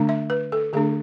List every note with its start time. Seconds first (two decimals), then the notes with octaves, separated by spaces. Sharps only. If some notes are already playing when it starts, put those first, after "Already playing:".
Already playing: D3 A3 D4
0.09 E5
0.30 B4
0.52 A4
0.73 D3 A3 D4 G#4